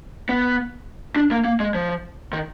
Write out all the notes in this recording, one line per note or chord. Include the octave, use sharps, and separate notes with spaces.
B3
D4
A#3
A#3
G#3
F3
D#3